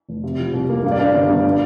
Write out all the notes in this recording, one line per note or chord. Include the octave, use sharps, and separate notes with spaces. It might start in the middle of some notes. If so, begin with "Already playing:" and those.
F1
C3
F3
C2
A#3
G2 F5
D5
G2 F5
G1
G2
A#2